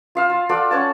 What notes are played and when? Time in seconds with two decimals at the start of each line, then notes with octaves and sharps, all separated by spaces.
0.15 F4 F5 E6
0.30 F4
0.49 F4 A4 D5 F#5
0.71 C#4 C#5 F#5 A5